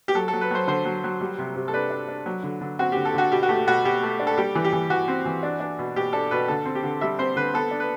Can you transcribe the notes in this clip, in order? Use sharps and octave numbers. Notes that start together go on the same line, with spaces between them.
G4
F#3 A4
A4
F#3
B4
F#3 C5
D3 C5
F#3
F#3
G3
C3
C3
A4
D4 B4
D4
D4
F#3
D3
D3
C4 F#4
D3 G4
A4
D3 F#4
B2 G4
F#4
A3 G4
B2 F#4
B2 G4
A3
D4
A4
G3 G4
E3
G4
E3
E3 F#4
C4
E3
D4
D4
B2
B2 G4
D4 A4
B2 B4
D3 A4
C4
G4
D3
G3 E5
C4 C5
D3 B4
B3 A4
D4
B4